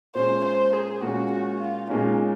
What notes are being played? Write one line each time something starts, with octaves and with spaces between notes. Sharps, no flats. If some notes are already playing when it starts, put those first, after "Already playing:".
A#2 G#3 C#4 C5
C5
G#4
A#2 G#3 C#4 F#4
F#4
F4
A#2 G#3 C#4 D#4